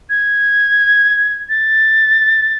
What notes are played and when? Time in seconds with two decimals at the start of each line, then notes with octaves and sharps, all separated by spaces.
0.10 G#6
1.49 A6